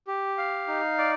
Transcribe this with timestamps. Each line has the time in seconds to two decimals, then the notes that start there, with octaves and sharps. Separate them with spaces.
0.07 G4
0.38 F5
0.68 D#4
0.98 D5